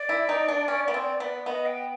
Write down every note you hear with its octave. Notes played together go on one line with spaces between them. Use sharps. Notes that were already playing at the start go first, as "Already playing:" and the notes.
Already playing: D5
E4
D#4
D4
C#4
B3
C4
B3
B3 D#5
G5